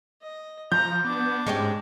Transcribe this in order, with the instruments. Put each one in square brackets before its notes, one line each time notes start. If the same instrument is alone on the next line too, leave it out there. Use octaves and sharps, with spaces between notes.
[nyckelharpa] D#5
[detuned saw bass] F3 [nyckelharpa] A#5 [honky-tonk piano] G6
[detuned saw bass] B3 [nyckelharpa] D4 D6
[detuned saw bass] G#2 [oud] G#3 C#4 G4